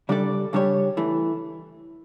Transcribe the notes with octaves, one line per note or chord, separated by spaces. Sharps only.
C#3 G3 D4 A4 D5
C#3 G3 D4 G4 C#5
E3 A3